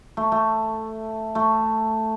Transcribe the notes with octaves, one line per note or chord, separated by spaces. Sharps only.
A3
A3
A3